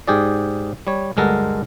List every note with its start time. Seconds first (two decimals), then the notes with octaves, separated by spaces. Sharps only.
0.08 G#2 G4 G#4 D5
0.87 G3 C#5
1.17 D2 G2 G#3 A4 A#4 F#5